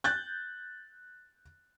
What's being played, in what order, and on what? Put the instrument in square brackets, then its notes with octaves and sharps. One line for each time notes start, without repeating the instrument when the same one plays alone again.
[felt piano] F#6 G6 A6